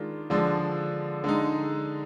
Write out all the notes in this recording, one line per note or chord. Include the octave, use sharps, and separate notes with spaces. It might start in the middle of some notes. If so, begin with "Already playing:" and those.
Already playing: D#3 G#3 D4 F4
D3 F3 G#3 D4
D3 G#3 D#4